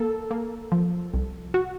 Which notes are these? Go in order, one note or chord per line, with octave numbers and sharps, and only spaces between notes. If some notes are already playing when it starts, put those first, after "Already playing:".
Already playing: A#3 A4
A#3
F3
C2
F#4